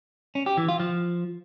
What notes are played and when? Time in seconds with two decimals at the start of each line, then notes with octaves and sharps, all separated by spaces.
0.35 C#4
0.46 G4
0.57 E3
0.69 F4
0.80 F3